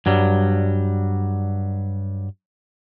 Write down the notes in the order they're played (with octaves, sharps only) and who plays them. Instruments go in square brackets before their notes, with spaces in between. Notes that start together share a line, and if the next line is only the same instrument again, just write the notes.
[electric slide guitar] G2 F#3 G3